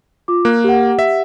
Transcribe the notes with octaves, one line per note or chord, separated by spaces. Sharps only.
F4 D6
A#3 F#6
G4 F#5
E5